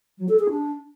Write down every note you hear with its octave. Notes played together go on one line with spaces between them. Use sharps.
F#3
A4
G#4
D4